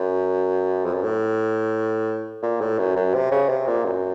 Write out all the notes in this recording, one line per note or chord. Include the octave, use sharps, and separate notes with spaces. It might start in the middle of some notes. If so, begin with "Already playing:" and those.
Already playing: F#2
F2
F#2
A2
A#2
A2
F#2
F#2
C3
C#3
C3
A#2
F#2